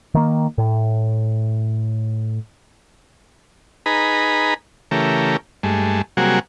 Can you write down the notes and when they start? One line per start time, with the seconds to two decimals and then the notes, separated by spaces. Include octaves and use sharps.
0.14 D#3 A#3
0.58 A2
3.86 D#4 G#4 B4 A#5 B5
4.91 C#3 E3 A3 G4 A#4
5.63 G2 G#3 A3
6.17 C3 F#3 G3 A#3 F#4 G#4